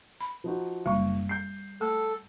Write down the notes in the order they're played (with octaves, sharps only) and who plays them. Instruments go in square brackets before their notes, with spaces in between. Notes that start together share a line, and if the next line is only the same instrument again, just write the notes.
[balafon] B5
[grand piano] F3 D#4 F#4
[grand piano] F#1 C#6 [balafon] G3
[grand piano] G6 C7
[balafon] A3 [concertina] A4